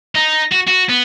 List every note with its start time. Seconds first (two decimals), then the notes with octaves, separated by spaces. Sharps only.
0.15 D#4
0.52 F#4
0.67 F#4
0.89 B3